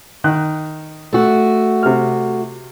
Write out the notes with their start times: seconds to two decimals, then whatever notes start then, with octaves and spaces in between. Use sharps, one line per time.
0.24 D#3 F#6
1.13 A3 F#4
1.83 C3 F6